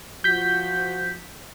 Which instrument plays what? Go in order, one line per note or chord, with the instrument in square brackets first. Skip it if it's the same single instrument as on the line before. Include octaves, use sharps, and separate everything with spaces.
[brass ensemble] F3 F#4 [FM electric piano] G6 B6